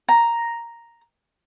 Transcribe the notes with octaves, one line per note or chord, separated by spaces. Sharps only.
A#5